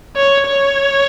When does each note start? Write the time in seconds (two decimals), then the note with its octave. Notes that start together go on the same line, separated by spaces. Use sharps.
0.16 C#5
0.47 C#5